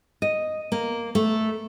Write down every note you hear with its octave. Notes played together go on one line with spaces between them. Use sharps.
D#5
A#3
A3